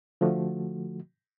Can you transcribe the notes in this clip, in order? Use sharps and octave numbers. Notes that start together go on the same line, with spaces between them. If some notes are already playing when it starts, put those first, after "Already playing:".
D3 F3 A3 F#4